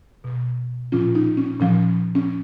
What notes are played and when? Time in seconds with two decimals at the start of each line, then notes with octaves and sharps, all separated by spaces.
0.24 B2
0.92 A#2 F3 C#4 F4
1.15 D#4
1.37 C#4
1.60 A#2 F3 C#4
2.15 C#4